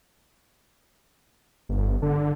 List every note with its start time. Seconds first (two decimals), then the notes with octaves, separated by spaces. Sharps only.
1.69 G1
2.02 D3